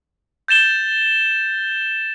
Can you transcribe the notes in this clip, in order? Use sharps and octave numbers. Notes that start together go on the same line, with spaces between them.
G6 A6 E7 G7